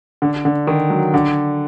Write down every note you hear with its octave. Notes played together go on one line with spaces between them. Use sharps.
D3
D3
D#3
F#3
D3